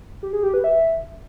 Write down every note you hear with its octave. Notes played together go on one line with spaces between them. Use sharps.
G4
G#4
G4
B4
E5